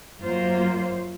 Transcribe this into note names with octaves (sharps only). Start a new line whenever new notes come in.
F#2 F#3 A#3 F4 C5